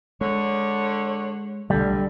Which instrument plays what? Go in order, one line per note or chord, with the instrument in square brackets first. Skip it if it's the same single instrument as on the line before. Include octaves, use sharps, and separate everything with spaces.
[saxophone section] D3 C#5 [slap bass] G#3
[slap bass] B1 A3 [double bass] D3 [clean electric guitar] G3